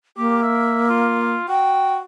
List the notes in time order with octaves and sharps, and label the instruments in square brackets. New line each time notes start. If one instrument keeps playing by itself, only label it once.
[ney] A#3 [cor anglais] G4
[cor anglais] E5
F4
[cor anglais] F#4 [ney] G5